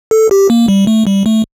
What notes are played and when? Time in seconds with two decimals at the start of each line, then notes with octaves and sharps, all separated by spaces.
0.11 A4
0.31 G4
0.50 A#3
0.68 G3
0.87 A3
1.07 G3
1.26 A3